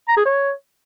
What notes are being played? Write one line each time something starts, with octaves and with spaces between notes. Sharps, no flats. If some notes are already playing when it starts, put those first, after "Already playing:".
A#5
G#4
C#5